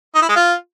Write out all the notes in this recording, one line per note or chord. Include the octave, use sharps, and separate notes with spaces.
D#4
E4
G#3
F4